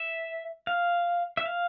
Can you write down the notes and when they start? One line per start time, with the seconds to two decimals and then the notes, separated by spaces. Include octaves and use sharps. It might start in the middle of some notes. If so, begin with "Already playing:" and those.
Already playing: E5
0.67 F5
1.37 E5
1.46 F5